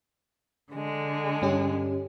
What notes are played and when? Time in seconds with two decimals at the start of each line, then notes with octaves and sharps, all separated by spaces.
0.74 D3 G#3
1.42 G2 C#4 G4